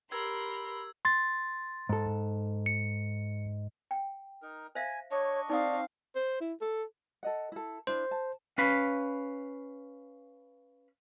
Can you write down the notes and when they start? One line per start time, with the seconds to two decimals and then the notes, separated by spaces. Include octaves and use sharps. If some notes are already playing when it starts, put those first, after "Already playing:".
0.12 G4 A#4 B5 C6 E6 G#6
1.05 C6 A6
1.89 G#2 A4
2.66 C#7
3.91 G5
4.42 D#4 A#4
4.75 C5 E5 F5 G#5
5.11 D4 C#5 D#5 C#6
5.50 C4 D#4 D5 F5 D6 D#6
6.16 C5
6.41 E4
6.61 A4
7.23 A4 D#5 F#5
7.52 E4 A4
7.87 D4 E4 C5
8.11 A5
8.58 C#4 B4 F5 B5